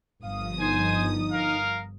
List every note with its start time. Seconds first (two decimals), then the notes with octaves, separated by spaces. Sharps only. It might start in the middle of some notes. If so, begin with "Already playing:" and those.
0.23 G1 F3 F5 D#6
0.59 D#4 C5 G#5
1.31 A#4 F5